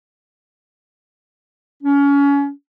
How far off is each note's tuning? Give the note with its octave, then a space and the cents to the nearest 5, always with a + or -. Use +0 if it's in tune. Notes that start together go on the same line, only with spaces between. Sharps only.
C#4 +30